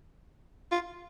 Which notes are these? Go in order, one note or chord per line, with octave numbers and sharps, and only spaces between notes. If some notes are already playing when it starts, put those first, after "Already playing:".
F4